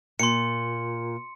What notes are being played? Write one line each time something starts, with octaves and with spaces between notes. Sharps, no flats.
A#2 C6 C#7